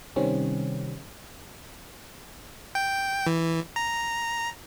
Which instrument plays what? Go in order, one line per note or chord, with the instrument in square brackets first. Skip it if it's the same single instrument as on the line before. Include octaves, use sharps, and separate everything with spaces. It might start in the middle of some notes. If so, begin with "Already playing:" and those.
[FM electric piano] C3 D#3 G3 C4 C#4
[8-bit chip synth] G5
E3
A#5